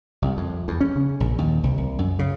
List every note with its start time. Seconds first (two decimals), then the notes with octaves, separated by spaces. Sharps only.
0.22 C2
0.37 F2
0.68 E2
0.81 C#4
0.96 C#3
1.20 A#1
1.38 D#2
1.64 C2
1.78 C2
1.99 F#2
2.19 C#3